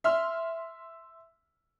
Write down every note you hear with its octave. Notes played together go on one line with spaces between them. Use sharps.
E5 C6 F6